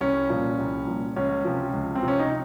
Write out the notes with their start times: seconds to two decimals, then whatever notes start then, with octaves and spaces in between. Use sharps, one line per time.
0.01 C2 C#4
0.30 A#2 F3
0.58 C2
0.87 A#2 F3
1.16 C#2 C#4
1.45 C3 F3
1.73 C#2
1.95 C4
2.03 C3 F3
2.08 C#4
2.19 D#4